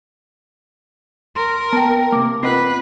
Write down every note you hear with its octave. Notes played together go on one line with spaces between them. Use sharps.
A#4 C6
B3 G5 A5
C3 A#3 D6
C4 F4 A#4 B4 D#5 F#5 C7